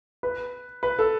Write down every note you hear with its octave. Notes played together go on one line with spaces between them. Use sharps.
B4
B4
A4